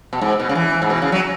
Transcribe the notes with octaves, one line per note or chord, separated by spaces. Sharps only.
B2
G#2
B2
C#3
E3
G#2
B2
C#3
F#3